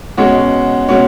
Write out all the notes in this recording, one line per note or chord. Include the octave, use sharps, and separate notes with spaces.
B2 G#3 C#4 F#4
B2 G#3 C#4 F#4